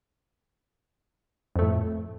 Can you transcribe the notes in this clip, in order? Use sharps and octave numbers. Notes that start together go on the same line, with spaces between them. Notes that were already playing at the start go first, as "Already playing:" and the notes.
F2 A2 A3